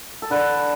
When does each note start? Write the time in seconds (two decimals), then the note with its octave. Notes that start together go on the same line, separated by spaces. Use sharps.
0.22 A4
0.30 D3 B4